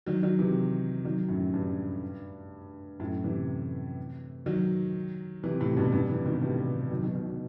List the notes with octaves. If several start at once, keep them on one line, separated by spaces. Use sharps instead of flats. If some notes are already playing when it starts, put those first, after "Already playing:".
D#3 F#3
D#3 F#3
C3 E3
D#3 F#3
F#2 A2
G2
F#2 A2
C3 E3
D#3 F#3
C3 E3
A2 C3
G2 B2
G2
C3 E3
B2 D#3
A2 C3
D#3 F#3
B2 D#3
B2 D#3
B2